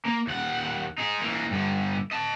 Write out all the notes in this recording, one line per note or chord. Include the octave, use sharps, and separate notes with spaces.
A#3
D#2 F#5
D#4 G#4
E3 A#3
G2 D3
D#5 A5